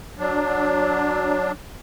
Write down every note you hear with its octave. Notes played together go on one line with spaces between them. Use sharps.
F#3 D4